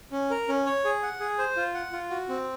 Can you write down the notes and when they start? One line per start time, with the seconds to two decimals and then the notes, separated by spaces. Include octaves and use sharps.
0.12 C#4
0.30 A#4
0.48 C#4
0.66 C#5
0.84 G#4
1.03 F#5
1.20 G#4
1.38 C5
1.56 F4
1.74 F#5
1.93 F4
2.10 F#4
2.29 C4